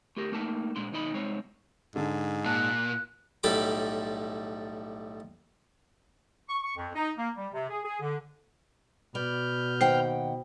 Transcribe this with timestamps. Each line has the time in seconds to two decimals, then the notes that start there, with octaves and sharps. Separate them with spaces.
0.17 A3 G4 A#4
0.32 A3 A#3 D#4 A5
0.76 A#2 G#3 D4 C6
0.92 D#2 B2 D#4 D#5 B5
1.14 C2 G#3 C4 D#4 C5 C#5
1.96 G#2 D3
2.46 A#2 A5 F#6
3.43 B1 A2 G3 A4 B5 D6
6.48 C#6
6.62 C#6
6.77 F2
6.94 D#4
7.17 A#3
7.36 G3
7.53 C3
7.70 G#4
7.84 G#4
8.01 D3
9.15 B2 B4 D5 F6 G6
9.81 D#2 C5 F#5 G5